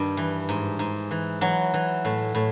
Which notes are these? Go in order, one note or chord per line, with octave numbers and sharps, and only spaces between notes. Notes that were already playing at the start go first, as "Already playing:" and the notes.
Already playing: G2 D#3
E3
G#2
G#2
E3
E3 F#3
E3
A2
A2